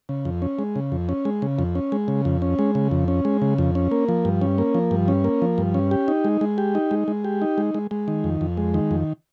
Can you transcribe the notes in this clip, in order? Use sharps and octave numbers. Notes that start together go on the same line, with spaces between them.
C#3
F2
C#4
G#3
C#3
F2
C#4
G#3
C#3
F2
C#4
G#3
C#3
F2
C#4
G#3
C#3
F2
C#4
G#3
C#3
F2
C#4
A#3
F3
G2
C#4
A#3
F3
G2
C#4
A#3
F3
G2
C#4
G4
D#4
G#3
G#3
G4
D#4
G#3
G#3
G4
D#4
G#3
G#3
G#3
D#3
F2
F2
G#3
D#3
F2